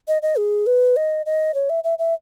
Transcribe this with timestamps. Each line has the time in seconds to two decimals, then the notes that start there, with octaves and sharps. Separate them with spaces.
0.08 D#5
0.22 D#5
0.38 G#4
0.66 B4
0.96 D#5
1.26 D#5
1.54 C#5
1.70 E5
1.84 E5
1.99 E5